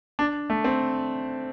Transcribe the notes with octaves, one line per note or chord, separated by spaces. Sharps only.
D4
A3
C4